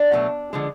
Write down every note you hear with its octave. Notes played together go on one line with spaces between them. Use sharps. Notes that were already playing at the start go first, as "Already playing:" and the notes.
Already playing: D4
B2 F#3 A3
D3 F3 G#3